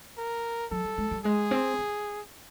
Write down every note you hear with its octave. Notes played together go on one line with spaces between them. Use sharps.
A#4
F#3 A4
G3
G#3
G3
G#3 G#4
C4
C#4